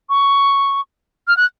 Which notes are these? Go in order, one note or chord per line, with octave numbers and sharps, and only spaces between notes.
C#6
F6
F#6